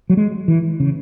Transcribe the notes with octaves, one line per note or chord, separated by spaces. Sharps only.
F#3
G#3
E3
C#3